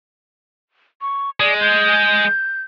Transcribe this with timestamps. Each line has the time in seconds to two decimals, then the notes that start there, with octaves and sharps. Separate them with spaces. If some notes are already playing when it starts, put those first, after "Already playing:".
1.02 C#6
1.40 G#3 D5
1.61 G6